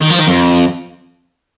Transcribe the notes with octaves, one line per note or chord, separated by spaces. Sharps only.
D#3
F3
D#3
F2